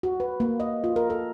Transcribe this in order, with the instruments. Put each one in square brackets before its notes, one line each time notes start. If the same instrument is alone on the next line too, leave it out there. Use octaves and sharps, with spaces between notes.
[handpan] F#4
B4
A#3
D#5
F4
A#4
A4